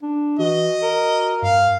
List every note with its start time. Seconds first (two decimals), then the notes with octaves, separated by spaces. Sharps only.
0.02 D4
0.39 E3 F#4 D#5
0.82 A#4
1.42 G2 F5